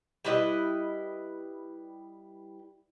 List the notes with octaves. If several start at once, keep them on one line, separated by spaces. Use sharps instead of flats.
G3 E4 B4 D#5